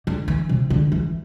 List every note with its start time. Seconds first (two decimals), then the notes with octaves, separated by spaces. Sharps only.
0.07 D3
0.28 E3
0.49 C3
0.70 D3
0.92 E3